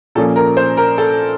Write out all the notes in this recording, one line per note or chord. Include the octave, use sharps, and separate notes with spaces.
A#2 F3 A#3 C#4 A4
A#4
C5
A#4
A4